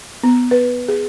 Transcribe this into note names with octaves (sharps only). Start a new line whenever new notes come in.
B3
B4
G#4